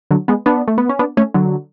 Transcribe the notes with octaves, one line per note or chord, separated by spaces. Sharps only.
D3 F#3
G#3 B3
B3 D4
A3
B3
C#4
B3 D4
A3 C#4
D3 F#3